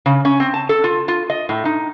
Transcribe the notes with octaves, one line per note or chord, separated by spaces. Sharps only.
C#3
C#4
C4
A5
A4
F4
F4
D#5
A2
D#4